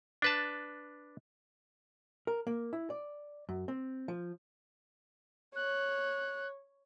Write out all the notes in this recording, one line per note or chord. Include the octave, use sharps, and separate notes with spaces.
D4 B4 A5
A#4
A#3
E4
D5
F#2
C4
F3
C#5 F#6